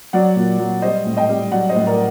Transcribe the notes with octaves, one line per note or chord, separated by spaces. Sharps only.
F#3 D5 F#5
A#2
F#3
G3 C5 D#5
A2
D#5 G5
G3
F#3 D5 F#5
C5 D#5
A2
A#4 D5